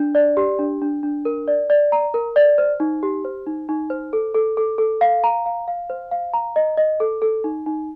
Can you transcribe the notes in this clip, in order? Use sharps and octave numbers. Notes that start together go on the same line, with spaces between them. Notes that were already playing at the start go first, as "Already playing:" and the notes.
Already playing: D4
D5
G4
D4
D4
D4
A#4
D5
D5
A#5
A#4
D5
C5
D#4
G4
C5
D#4
D#4
C5
A4
A4
A4
A4
F5
A#5
F5
F5
C5
F5
A#5
D#5
D#5
A4
A4
D#4
D#4